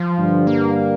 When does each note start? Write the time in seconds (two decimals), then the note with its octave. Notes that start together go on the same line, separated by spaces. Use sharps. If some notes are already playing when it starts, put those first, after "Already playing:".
Already playing: F3
0.19 G2 D3 G3
0.47 A#3